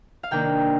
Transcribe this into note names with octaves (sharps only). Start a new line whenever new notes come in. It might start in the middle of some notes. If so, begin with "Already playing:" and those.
F5
C3 D#3 A#3 D4 G5